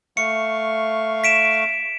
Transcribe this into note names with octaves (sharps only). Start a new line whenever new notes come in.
A3 F5 C#6 C#7
B6 D7 E7